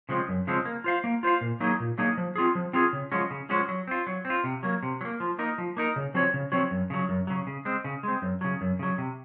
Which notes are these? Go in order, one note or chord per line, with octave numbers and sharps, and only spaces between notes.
C#3 F3 G#3 C4
F#2
C#3 F3 G#3 C4
A#3
F4 C5 F5
A#3
F4 C5 F5
A#2
F#3 A#3 D#4 G#4
A#2
F#3 A#3 D#4 G#4
F3
C4 F4 G#4
F3
C4 F4 G#4
C#3
F3 G#3 C#4 F#4
C#3
F3 G#3 C#4 F#4
F#3
C4 F4
F#3
C4
F4
C3
F#3 A#3
C3
F#3
A#3
F3
A#3 D#4 A#4
F3
A#3 D#4 A#4
C#3
F3 C4 F#4 C#5
C#3
F3 C4 F#4 C#5
F#2
C#3 F#3
F#2
C#3 F#3
C#3
G#3 C4
C#3
G#3 C4
F#2
C#3 F#3
F#2
C#3 F#3
C3